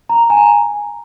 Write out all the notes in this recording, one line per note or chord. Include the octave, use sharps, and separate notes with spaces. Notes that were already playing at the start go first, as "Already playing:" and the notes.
A#5
G#5
A#5